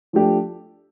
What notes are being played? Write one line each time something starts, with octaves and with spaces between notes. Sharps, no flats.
F3 A3 D4 G4